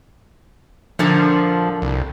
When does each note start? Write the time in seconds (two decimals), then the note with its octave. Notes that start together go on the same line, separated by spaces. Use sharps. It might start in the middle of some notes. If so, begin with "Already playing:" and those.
0.99 A#2 D3 F3
1.82 C2